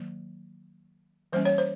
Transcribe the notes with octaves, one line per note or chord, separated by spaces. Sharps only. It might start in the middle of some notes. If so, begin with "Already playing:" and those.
Already playing: D#3 F#3 A#3
E3 G3 A#3 C#4 C5
C#5
C5